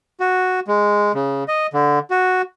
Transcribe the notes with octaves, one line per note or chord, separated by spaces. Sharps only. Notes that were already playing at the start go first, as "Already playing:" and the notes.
F#4
G#3
C#3
D#5
D3
F#4